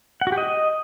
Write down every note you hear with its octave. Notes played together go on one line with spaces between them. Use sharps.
F#5
F#4
G4
D#5